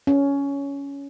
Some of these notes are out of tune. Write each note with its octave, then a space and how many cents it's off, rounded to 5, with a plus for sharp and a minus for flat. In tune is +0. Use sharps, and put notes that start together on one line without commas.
C#4 +15